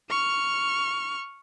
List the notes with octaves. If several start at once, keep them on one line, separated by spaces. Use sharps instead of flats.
C#6 F6